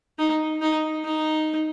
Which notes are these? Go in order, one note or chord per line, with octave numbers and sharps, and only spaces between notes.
D#4
D#4
D#4